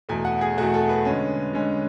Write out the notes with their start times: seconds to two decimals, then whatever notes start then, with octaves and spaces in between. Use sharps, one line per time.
0.09 E2 B2 A3 G#5
0.25 F#5
0.41 G#4
0.57 E2 B2 A3 F#4
0.74 A4
0.89 B4
1.05 D3 G#3 C#4
1.53 D3 G#3 C#4